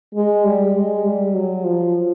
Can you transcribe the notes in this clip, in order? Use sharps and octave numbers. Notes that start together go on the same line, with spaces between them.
G#3
G3
G#3
G3
F#3
F3